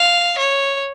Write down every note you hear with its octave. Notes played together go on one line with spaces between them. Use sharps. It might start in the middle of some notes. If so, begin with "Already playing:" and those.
Already playing: F5
C#5